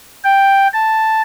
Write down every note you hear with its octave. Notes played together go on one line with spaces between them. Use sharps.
G5
A5